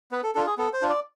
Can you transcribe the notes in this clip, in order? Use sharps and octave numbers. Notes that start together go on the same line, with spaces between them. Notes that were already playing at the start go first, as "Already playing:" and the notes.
B3 B4
A4
D4 F4 A4
G#4
B3 A4
C5
D4 F4
D5